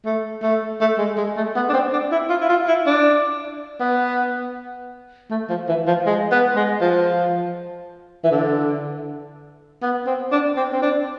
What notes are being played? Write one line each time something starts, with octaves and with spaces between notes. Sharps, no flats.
A3
A3
A3
G#3
G#3
A3
B3
D4
C4
D4
E4
F4
E4
F4
E4
D4
B3
A3
F3
E3
F3
G#3
B3
G#3
F3
E3
D3
B3
C4
D4
C4
C4
D4